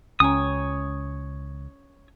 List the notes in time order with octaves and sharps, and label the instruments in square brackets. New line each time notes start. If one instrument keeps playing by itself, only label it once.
[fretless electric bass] C#2 [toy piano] C#4 G#5 A#5 [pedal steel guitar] C#5 D#6